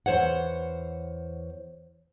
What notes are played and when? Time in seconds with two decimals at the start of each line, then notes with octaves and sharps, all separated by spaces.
0.06 E2 E3 C5 C#5 F#5